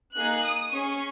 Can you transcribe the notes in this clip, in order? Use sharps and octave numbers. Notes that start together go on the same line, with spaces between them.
A#3 D#4 G#4 F#6
D#6
C#4 G#4 C#6